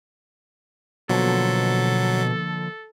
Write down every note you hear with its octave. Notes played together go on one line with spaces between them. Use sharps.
B2 D3 F3 F#3 A#3 A4